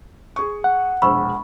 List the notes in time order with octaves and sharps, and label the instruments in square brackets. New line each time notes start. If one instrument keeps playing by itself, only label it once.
[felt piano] G#4 C#6
[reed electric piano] F#5
[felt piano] E1 A#1 E6 [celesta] B5 C#6